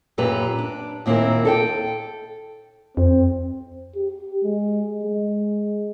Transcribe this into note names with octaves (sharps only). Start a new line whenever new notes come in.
F#2 A#2 G4 B4 A#5
D4
D#2 A#2 C4 C#4 E4 A#4
A4 E5 G5
F2 C4
G4
G#3
G#3